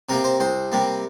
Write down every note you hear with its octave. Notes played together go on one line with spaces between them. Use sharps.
C3 G3 A#3 A#4
C5
C2 C5
C3 G3 A#3